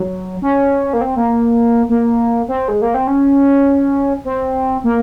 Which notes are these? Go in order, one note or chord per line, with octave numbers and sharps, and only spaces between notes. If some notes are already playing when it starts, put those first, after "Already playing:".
Already playing: F#3
C#4
A#3
C4
A#3
A#3
C4
G#3
A#3
C4
C#4
C4
A#3